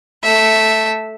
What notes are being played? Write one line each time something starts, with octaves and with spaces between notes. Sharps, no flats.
A3 E5